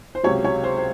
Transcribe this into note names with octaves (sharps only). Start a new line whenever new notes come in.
C5
C#2 C3 F#3 C#5
C#5
C5
C5